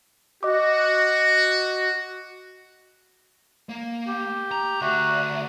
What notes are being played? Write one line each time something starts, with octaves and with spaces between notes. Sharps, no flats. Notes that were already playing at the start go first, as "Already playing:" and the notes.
F#4 D#5 D6
A#3
G4
A#5
D2 F#4 E5